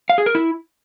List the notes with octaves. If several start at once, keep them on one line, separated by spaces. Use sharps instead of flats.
F5
G#4
A#4
E4